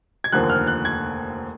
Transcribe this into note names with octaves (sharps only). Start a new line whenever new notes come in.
G#6
F1 D#2 D3 F3 A#3 F#6
F6
F#6
G#6